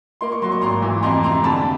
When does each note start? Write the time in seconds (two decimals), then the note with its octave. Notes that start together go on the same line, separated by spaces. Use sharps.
0.21 A#3 C6
0.32 C#6
0.42 F#3 C6
0.52 C#6
0.61 G#1 A#5 C6
0.82 E3
1.03 F2 A#5 C6
1.23 C3 A#5 C6
1.44 D3 A5 B5